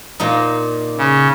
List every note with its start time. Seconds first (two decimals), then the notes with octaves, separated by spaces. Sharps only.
0.20 A#2 A#3 D#4
0.98 C#3